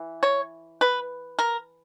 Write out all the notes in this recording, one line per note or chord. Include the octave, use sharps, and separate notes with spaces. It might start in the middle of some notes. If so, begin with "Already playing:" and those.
Already playing: E3
C#5
B4
A#4